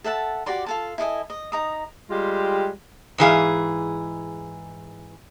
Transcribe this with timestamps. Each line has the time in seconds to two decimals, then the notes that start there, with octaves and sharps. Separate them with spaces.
0.04 A4 E5 F#5 A5
0.46 F#4 G4 D5 C6
0.66 F4 A4 A5
0.98 E4 A4 D#5 G#5
1.30 D#5
1.52 D#4 A#5 D#6
2.11 G3 G#3 F4 G4
3.18 G#2 E3 G#4 F5